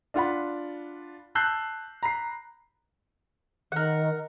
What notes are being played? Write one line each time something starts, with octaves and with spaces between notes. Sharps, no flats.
D4 F4 F#5 B5
A5 E6 F#6 G6 C7
A#5 B5 C7
D#3 A#4 F#5